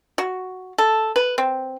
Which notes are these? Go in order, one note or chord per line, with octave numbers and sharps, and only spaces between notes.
F#4
A4
B4
C4